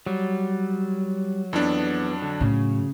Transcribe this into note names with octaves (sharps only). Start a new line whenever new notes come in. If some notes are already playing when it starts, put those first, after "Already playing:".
F#3 G3
F2 E3 B3 D4
D3
A2 C#3